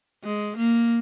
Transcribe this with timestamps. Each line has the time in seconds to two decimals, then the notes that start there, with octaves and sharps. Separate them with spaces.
0.24 G#3
0.57 A#3